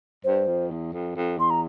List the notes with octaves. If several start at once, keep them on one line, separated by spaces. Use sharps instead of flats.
G2 C5
F2
E2
F2
F2
E2 C6
A#5